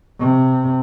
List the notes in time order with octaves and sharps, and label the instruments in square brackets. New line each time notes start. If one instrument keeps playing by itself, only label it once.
[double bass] C3